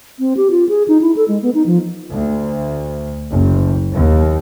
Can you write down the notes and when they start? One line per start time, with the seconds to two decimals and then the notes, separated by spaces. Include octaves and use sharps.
0.19 C4
0.37 G4
0.51 F4
0.69 G#4
0.88 D#4
1.01 E4
1.17 A4
1.28 G#3
1.43 B3
1.55 D#4
1.66 F3
2.10 D2
3.30 F#1
3.93 D#2